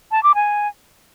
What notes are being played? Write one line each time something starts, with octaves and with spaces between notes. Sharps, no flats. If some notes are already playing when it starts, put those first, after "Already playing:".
A5
D6
G#5